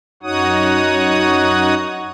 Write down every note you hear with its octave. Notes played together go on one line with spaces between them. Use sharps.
F#2 D#4 F#4 C#5 F#5 D#6